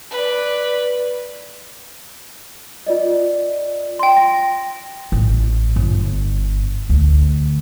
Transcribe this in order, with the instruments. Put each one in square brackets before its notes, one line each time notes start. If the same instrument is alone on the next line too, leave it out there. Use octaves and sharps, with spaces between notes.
[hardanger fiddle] B4 D5
[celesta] F4 D5 D#5
[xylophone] G5 C6
[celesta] A#6
[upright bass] A1
G1
D2